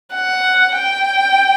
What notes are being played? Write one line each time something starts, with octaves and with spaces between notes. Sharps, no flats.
F#5
G5